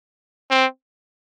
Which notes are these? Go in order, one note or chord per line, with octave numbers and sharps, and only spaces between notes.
C4